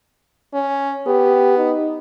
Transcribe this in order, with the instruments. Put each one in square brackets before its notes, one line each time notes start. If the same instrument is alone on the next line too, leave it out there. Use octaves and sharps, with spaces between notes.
[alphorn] C#4
[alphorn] B3 [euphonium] G4
[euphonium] D#4